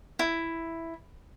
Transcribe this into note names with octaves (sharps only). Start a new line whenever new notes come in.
E4